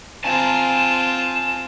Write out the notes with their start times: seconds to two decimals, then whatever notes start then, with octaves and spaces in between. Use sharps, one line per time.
0.25 C4 F4 G#5 A5 E7